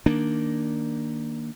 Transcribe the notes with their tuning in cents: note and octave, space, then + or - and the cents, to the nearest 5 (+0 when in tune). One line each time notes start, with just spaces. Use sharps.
D#3 +0 A#3 +0 D4 +0